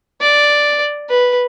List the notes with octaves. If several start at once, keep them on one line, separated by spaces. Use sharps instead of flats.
D5
B4